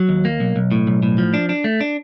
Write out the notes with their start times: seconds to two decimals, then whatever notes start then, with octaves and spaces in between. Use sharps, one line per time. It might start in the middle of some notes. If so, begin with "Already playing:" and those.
Already playing: F#3
0.09 D#2
0.25 A#3
0.40 B1
0.56 B1
0.72 A2
0.87 B1
1.03 A2
1.18 F3
1.34 D4
1.49 D4
1.64 A3
1.81 D4